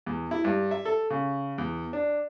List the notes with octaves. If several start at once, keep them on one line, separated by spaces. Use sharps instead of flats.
E2
E4
G2
E5
A4
C#3
E2
D4